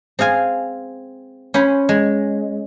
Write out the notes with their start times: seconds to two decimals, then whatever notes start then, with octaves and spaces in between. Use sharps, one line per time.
0.19 C4 G#4 F5 G#5
1.54 C#4 C5 G#5 B5
1.89 G#3